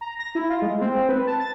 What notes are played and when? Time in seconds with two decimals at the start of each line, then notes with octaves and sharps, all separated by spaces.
0.01 A#5
0.19 A#6
0.35 E4
0.50 F4
0.62 G#3
0.82 C4
1.09 B4
1.27 A5
1.40 A6